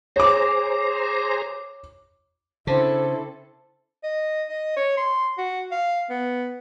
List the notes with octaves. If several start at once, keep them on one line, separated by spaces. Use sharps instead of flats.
G#4 C5 C#5 A#5 D6
C#3 C4 D4 E4 A4 C5
D#5
D#5
C#5
C6
F#4
F5
B3